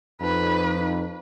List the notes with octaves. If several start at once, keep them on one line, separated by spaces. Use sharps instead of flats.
F2 D#4 B4
D#4